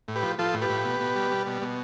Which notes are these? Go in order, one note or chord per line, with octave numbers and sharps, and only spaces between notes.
A2
G4 B4
F3
F3 F4 A4
A2
G4 B4
A2
B2
B2
G3
G3
B2
B2